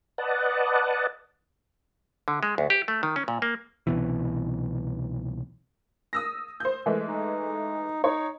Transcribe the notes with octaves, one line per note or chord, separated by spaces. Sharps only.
B4 D5 D#5 F#5 A5
D3
G#3
D2
G4
A3
D#3
C#4
A#2
A#3
C2 B2 E3
D#6 E6 A#6
C5 G6
E3 G#3 A3
D#4
D#4 C#5